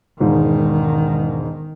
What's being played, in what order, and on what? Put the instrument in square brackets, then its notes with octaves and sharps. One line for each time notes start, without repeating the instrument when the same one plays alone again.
[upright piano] E1 G#2 [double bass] D#3